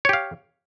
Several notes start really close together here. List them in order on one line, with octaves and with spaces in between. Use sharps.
C#5 G4 F5